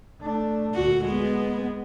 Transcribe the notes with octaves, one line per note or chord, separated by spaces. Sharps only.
A3 D4
D2 A#2 F#4
G#3 B3